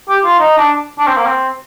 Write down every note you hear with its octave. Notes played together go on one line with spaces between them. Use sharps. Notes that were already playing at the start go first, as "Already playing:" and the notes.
G4
F4
D#4
D4
D4
C4
A#3
C4